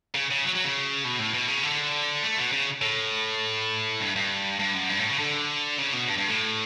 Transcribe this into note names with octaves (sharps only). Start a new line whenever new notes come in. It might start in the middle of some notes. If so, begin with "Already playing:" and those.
C#3
C#3
F#3
F#3
C#3
B2
A2
B2
C#3
D3
A3
B2
C#3
A2
G2
G2
G2
F#2
G2
A2
C#3
D3
C#3
B2
G2
G2
A2